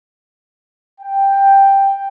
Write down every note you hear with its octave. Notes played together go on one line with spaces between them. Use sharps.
G5